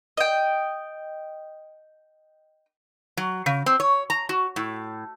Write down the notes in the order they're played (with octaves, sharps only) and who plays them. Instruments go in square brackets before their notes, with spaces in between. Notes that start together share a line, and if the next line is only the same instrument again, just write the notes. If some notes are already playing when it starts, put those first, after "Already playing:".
[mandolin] D#5 G5
[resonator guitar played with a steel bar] F#3
C#3
C4
C#5
A#5
F#4
A2